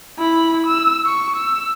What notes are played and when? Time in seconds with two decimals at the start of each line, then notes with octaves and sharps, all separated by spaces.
0.19 E4 B5
0.67 E6
1.06 C#6
1.36 E6